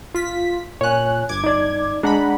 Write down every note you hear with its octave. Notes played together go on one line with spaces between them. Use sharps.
F4 B6
A#2 C#5 G#5 F#6
G1 D6 G#6
D#4 D5
G#3 D4 F#5 A#5 B5